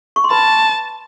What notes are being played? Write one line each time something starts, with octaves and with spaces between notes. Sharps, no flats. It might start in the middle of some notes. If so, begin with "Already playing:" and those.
C#6
C6
B4 A5 B5